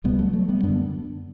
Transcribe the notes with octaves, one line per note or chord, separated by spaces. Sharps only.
C#2 B2 G3 B3
F#3 A3
F#3 A3
G3 B3
F#2 D3 B3 D4